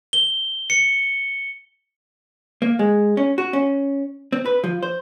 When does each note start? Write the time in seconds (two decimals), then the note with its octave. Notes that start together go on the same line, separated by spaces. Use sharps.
0.13 G7
0.70 C#7
2.62 A#3
2.79 G#3
3.17 C#4
3.38 F#4
3.53 C#4
4.32 C4
4.46 B4
4.64 F3
4.83 C5